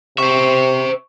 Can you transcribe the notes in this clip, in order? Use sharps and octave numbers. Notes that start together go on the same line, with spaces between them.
C3 C5 E5 C#6